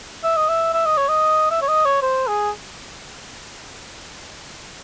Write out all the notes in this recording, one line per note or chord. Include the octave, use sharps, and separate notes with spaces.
E5
D#5
E5
E5
D#5
C#5
D#5
E5
C#5
D#5
C#5
C5
G#4